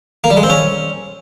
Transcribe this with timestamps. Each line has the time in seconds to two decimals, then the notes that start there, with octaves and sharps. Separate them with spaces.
0.24 A#3
0.30 G3
0.37 G#3
0.43 C4
0.50 C#4